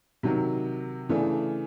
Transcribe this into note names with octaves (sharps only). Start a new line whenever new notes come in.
C3 D#3 F#3
C#3 E3 A3 D4